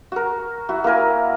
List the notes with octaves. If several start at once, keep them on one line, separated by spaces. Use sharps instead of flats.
F#4 A#4
E4 F#4
A#3 E4 A#4 G#5